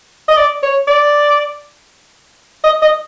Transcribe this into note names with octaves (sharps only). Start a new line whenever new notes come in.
D#5
D5
C#5
D5
D#5
D#5